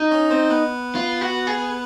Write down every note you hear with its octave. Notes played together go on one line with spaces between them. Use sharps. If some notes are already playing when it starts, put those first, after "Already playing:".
Already playing: D#4
C#4 C#5
C4 C5
B3 B4
F4
F#4
G#4